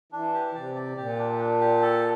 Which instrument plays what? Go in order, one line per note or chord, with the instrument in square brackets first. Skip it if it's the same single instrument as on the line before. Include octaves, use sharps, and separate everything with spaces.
[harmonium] E3 [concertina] D4
[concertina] G4
[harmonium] C3 [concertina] D5
[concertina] D5
[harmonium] A#2 [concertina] G4
[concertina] D4
D4
G4
A4